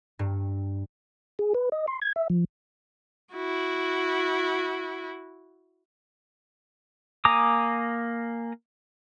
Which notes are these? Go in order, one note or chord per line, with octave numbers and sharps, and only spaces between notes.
G2
G#4
B4
D#5
C6
G#6
E5
F3
E4 F#4
A#3 G#5 A#5 D6 D#6